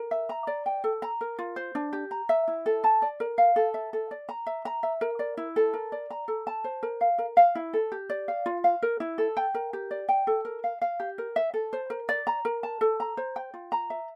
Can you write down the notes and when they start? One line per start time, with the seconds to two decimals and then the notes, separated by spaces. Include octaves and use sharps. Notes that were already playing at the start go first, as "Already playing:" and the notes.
Already playing: A#4
0.11 E5
0.29 A#5
0.47 D5
0.66 G5
0.84 A4
1.02 A#5
1.21 A#4
1.39 F4
1.56 C5
1.75 D4
1.93 G4
2.11 A#5
2.29 E5
2.48 E4
2.66 A4
2.84 A5
3.02 D5
3.20 A#4
3.38 F5
3.56 A4
3.74 E5
3.93 A4
4.11 D5
4.29 A#5
4.47 E5
4.65 A#5
4.83 E5
5.01 A#4
5.19 D5
5.37 E4
5.56 A4
5.74 A#4
5.92 D5
6.10 A#5
6.28 A4
6.47 A5
6.64 C5
6.83 A#4
7.01 F5
7.18 A#4
7.37 F5
7.55 E4
7.73 A4
7.92 G4
8.10 D5
8.28 F5
8.46 F4
8.64 F5
8.83 A#4
9.00 E4
9.18 A4
9.37 G5
9.55 A#4
9.73 G4
9.91 D5
10.09 G5
10.27 A4
10.45 A#4
10.64 F5
10.82 F5
11.00 G4
11.18 A#4
11.36 E5
11.54 A4
11.73 C5
11.90 A#4
12.09 D5
12.27 A#5
12.45 A#4
12.63 A5
12.81 A4
13.00 A#5
13.17 C5
13.36 G5
13.54 F4
13.72 A#5
13.90 E5